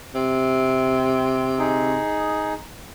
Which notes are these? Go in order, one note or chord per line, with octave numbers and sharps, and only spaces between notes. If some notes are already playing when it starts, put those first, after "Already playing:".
C3
D#4 G#4